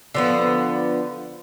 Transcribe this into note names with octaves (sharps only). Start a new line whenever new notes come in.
D3 F3 B3